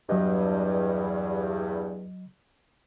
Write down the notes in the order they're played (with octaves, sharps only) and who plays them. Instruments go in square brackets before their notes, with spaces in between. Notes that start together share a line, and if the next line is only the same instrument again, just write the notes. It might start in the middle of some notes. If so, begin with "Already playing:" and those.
[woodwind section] E2 G2 [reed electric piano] F#3 D#5